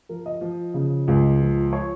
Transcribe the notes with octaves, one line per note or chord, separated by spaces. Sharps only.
F3 A#4
D#5
F3
C#3
C#2
F3
C#5